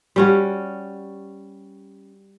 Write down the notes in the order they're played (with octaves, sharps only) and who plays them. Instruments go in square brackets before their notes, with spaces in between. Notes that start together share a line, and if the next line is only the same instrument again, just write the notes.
[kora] G3 C#4 F#4